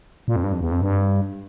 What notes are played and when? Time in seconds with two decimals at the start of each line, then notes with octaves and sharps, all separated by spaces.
0.28 A#2
0.36 F2
0.44 G2
0.52 F2
0.60 E2
0.71 F2
0.82 G2